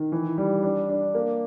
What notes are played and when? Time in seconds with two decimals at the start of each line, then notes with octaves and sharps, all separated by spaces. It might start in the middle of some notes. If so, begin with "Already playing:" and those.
Already playing: D#3
0.12 E3
0.38 G3
0.63 D4
0.89 D4
1.15 A#3